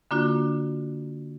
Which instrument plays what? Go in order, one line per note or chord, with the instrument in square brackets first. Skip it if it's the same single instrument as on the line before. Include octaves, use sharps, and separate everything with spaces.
[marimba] D3 A#3 D4 F4 F#4